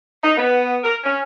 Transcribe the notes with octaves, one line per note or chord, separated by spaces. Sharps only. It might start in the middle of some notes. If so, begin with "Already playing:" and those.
D#4
B3
A#4
C#4